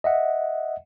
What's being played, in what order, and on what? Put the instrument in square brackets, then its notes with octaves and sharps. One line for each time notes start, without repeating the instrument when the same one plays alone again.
[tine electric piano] D#5 E5 F#5